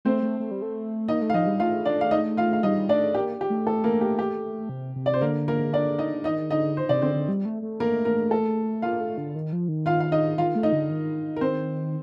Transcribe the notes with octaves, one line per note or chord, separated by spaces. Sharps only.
A3 C4 C5
A3
A3
G3
A3
A#3 D#4 D#5
A3
F5
F3 D#4 D#5
G3
A3 F4 F5
D4 D5
F5
D#4 D#5
F4 F5
F5
G3 D#4 D#5
A3 D4 D5
A#3 G4
G4
A3
A4
A#3 A#4
G4
G4
C3
C3
D5
C5
D3 A#3 A#4
A#3 A#4
D4 D5
D#4 D#5
D#3 D#4 D#5
D3 D#4 D#5
C5
C3 D5
D3 C4 C5
D3
G3
A3
A3
A#3 A#4
A#3 A#4
A4
A#3 F4 F5
A3
D3
D#3
F3
D#3
F4 F5
F5
D#4 D#5
D#3 F4 F5
A3
D#4 D#5
D3
D#3
A#4
C4 C5